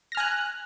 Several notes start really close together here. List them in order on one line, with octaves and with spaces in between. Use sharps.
A#6 F6 G#5 F#6